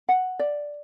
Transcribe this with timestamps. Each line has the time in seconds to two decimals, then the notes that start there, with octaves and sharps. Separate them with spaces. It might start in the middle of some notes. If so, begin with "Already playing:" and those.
0.09 F#5
0.39 D5